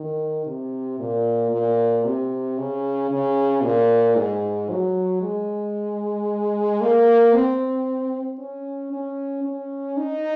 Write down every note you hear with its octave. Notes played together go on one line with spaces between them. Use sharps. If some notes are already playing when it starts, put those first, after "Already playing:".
Already playing: D#3
C3
A#2
A#2
C3
C#3
C#3
A#2
G#2
F#3
G#3
A#3
C4
C#4
C#4
C#4
D#4